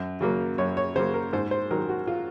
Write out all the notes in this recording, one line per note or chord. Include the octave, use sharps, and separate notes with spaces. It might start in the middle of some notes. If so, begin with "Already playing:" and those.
Already playing: F#2
C#3 F#3 A#3
F#2 C#5
C#5
C#3 F#3 A#3 C5
A#4
G#2 C5
C5
D#3 F#3 A#4
F#4
F4